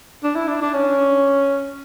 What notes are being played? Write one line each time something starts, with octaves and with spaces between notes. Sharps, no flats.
D4
E4
D4
D4
C#4